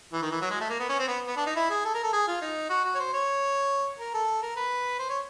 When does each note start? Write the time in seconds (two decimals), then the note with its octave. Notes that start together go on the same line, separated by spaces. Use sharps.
0.13 E3
0.22 D#3
0.31 E3
0.41 F#3
0.51 G#3
0.61 A3
0.70 A#3
0.80 B3
0.89 C#4
0.99 C4
1.08 B3
1.27 B3
1.37 D4
1.46 D#4
1.56 E4
1.70 G#4
1.85 A4
1.94 A#4
2.03 A4
2.13 G#4
2.28 F4
2.42 D#4
2.70 F#4
2.85 F#4
2.95 C#5
2.99 C5
3.13 C#5
3.99 A#4
4.14 A4
4.42 A#4
4.56 B4
4.99 C5
5.09 C#5